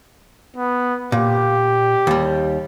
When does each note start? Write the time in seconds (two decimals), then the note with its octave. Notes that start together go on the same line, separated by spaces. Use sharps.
0.56 B3
1.12 A#2 G4
2.07 D#2 G3